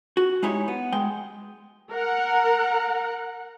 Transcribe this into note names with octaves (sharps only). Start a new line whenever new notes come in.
F#4
G#3 D#4 E4 G4 C#5
B3
G#3 G5
A#4 F#5